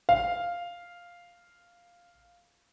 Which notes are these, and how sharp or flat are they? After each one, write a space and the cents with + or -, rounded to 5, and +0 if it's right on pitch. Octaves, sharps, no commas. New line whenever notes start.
F5 +0